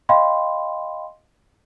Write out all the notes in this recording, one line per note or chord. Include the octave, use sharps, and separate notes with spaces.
D#5 F5 G5 B5 C6